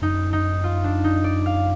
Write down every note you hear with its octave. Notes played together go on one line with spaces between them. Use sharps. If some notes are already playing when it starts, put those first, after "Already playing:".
F#2 D#4
D#4
F4
D4
D#4
D5
F5